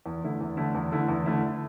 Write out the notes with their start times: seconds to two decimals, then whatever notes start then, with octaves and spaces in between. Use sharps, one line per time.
0.06 E2
0.24 D3 A3 E4
0.41 E2
0.57 D3 A3 E4
0.75 E2
0.92 D3 A3 E4
1.08 E2
1.26 D3 A3 E4